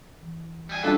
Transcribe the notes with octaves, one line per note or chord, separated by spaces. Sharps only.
E3
G3 G#5
G2 G3 C#4 D4 F4 F#4 A4 B4